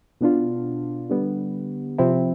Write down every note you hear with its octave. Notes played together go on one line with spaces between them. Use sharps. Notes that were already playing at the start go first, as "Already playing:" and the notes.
B2 B3 D4 F4
D3 G3 B3
C3 F3 C4 E4